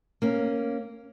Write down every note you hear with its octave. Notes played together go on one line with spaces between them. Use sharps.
A#3 C#4